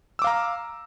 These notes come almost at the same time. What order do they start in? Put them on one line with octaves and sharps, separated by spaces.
E6 D6 F5 A#5